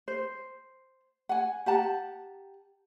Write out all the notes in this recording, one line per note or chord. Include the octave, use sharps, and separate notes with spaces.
C5
F#5 G#5
G4 F#5 A5 A#5